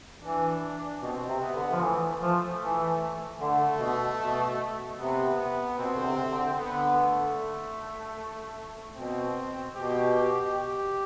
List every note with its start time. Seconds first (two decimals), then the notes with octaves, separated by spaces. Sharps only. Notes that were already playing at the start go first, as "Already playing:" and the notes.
0.22 E3 D4
1.02 B2 C4
1.29 C3
1.42 B3
1.55 D3
1.72 F3
1.81 E3 A3
2.22 F3
2.60 E3
3.40 D3 A3
3.79 B2
4.20 B2
4.99 C3 B3
5.39 B3
5.78 B2 C4
5.96 D3
6.05 C3
6.31 D3
6.57 D3 B3
6.98 A3
8.95 B2 C4
9.75 B2 G4
10.15 G4
10.55 G4